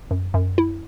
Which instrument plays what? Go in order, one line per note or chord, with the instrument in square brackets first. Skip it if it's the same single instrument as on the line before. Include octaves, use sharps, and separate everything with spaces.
[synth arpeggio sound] F#2
F#2
E4